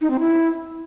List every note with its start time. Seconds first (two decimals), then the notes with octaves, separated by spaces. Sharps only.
0.01 D#4
0.10 C4
0.20 E4